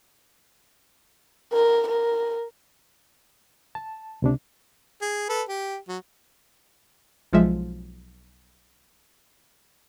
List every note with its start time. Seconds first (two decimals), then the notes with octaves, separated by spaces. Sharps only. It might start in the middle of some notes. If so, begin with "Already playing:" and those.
1.53 A#4
1.88 A#4
3.75 A5
4.22 C#2 C3 D4
5.02 G#4
5.29 A4 B4
5.49 G4
5.88 F#3
7.33 B1 F3 G#3 E5